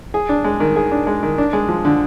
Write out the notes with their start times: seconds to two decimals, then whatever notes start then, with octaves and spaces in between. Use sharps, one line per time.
0.14 G#4
0.29 D4
0.44 G#3
0.60 D#3
0.76 G#4
0.91 D4
1.07 G#3
1.23 D#3
1.38 D4
1.53 G#3
1.69 F3
1.85 D3